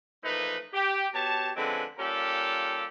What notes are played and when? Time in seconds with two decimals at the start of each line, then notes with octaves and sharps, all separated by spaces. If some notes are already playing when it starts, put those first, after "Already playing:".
0.24 E3 F3 A3 A#3 D#4 B4
0.74 G4
1.14 B2 G4 C#5 A5
1.57 D3 F3 G#3 C4 C#4 B4
1.99 G3 A#3 C#4 F4 G4 A4